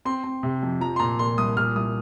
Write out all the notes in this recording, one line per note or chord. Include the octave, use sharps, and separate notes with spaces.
C4 C6
C4
C3
F2
F3 A#5
C6
A#2 A#5
A#2 C6
C2 D#6
A#2 F6
C2 D#6